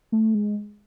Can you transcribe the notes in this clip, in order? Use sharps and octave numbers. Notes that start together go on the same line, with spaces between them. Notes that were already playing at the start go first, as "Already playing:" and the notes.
A3
G#3